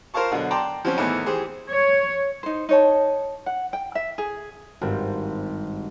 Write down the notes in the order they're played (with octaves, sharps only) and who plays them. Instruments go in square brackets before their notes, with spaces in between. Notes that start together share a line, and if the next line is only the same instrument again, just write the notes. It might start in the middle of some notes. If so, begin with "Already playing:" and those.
[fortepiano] F4 A#4 C5 F5 A5 C#6
B2 D3 F#3
D5 G5 A5 A#5 C6 D6
F3 F#3 C4 C#4
E2 A2 D#3 E3 B3 D#4
E3 G4 G#4 C5
[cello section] C#5
[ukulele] D#4 C5
D#4 C#5 A5
F#5
G5
E5
G#4
[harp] G#1 G2 C4